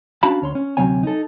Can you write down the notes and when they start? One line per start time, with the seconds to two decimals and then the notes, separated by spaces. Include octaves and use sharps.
0.23 C#4 D4 F#4 F5 A5 B5
0.42 D2 C#5 C6
0.55 C#4
0.77 D2 C3 F#3 C4 C#5 G#5
1.03 D#4 A4